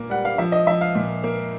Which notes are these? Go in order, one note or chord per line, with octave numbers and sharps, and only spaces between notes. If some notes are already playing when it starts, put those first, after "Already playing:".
Already playing: A#2 A#3
G3 F#5
F5
F3 E5
D#5
F3 E5
F5
A#2
A#3